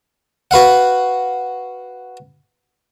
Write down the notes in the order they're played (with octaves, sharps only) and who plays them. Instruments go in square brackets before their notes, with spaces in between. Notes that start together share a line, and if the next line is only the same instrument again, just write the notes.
[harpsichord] F#4 B4 F5 F#5